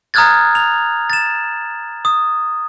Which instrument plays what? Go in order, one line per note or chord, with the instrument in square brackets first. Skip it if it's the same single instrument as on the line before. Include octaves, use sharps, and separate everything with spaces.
[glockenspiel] A#5 D#6 F6 F#6 G#6 A6
F7
A6 E7
D#6